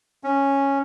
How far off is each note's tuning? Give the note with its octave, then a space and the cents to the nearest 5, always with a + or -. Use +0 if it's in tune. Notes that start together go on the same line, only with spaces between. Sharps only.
C#4 -5